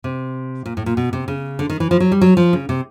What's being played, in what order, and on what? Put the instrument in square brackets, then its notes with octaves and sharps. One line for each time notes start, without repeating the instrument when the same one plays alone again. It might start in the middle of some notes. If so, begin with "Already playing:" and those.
[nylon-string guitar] C3
A#2
A2
A#2
B2
C3
C#3
D3
D#3
E3
F3
F#3
G3
F#3
F3
C#3
C3